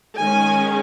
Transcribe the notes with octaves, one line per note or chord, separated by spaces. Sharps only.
D#3 G#3 C#4 G#5